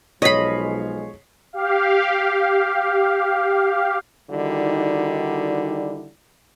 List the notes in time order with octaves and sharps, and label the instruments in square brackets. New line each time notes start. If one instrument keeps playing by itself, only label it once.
[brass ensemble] B1 F3 G#3 [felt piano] C#5 B6 C7 [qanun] D#5 B5
[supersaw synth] G4 F5
[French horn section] D3 D#3 G3 D#4 E4 F#4